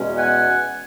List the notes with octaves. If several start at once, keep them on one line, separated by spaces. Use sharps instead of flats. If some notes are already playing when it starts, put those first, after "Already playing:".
Already playing: E2 B2 G#3 C#4
F#5 G#5